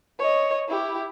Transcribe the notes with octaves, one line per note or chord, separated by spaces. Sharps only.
C#5 D#5
E4 G4